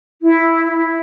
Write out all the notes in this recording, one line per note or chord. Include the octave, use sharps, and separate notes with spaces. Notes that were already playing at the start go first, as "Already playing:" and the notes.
E4
E4